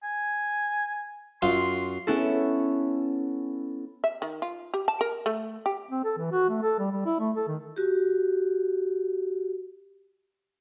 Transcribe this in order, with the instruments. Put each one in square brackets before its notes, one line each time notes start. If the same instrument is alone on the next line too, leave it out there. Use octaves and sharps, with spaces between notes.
[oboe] G#5
[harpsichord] F#2 F4 [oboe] C6
[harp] B3 C#4 E4 A4
[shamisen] E5
D#3
F4
G4
A5
A#4
A3
G4
[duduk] C4
A4
E3
F#4
A3
A4
G3
G3
E4
A3
A4
D#3
[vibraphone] F#4 G4